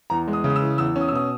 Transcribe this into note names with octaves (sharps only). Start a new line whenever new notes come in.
E2 A#5
G#3
D#6
C#3
D#6
E6
E3
E2 E6
C#4
D#6
E6
B2 D#6